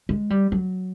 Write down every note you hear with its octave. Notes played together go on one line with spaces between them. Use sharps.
G#3
G3
F#3